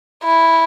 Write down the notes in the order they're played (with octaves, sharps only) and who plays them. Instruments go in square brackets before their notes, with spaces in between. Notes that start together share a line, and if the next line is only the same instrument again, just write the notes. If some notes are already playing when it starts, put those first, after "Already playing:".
[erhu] E4